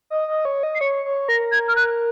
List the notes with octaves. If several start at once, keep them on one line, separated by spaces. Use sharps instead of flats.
D#5
D#5
C#5
D#5
C7
C#5 C#7
C#5
A#4 A#6
G#6
F6
F#6